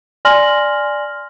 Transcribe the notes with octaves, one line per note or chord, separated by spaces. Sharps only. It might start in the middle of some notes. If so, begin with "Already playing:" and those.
D5 G#5 C6 F6 A#6 F#7